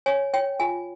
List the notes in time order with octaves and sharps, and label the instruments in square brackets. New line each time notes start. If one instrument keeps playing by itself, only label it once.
[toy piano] C#5 G#5
C#5 G5
F4 G#5